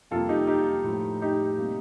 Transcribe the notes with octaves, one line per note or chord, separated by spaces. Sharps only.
F2 C3 G3 A#3 F4 A4
D#4 G4
D#4 G4
A2 F3 A3
D#4 G4
C3 G3 A#3